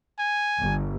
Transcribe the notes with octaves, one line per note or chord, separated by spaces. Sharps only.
G#5
G1